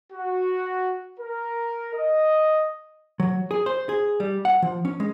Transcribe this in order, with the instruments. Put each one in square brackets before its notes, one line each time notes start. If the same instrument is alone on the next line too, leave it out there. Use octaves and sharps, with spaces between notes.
[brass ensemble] F#4
A#4
D#5
[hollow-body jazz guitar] F#3
G#4
C5
G#4
G3
F#5
F3
C#4
G#3